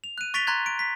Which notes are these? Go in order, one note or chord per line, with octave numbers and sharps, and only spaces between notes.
F7
F#6 D#7
C#6 A6 B6 D7 F7 G7
A#5 C6 F#6 G#6
D7
B6